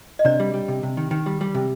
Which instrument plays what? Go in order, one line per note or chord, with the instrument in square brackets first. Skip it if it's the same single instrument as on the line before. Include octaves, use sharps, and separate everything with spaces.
[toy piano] D#5
[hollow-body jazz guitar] C3 [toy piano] D4 D5
[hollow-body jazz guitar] G3
G3
C3
C3
D#3
D#3
G3
G3
C3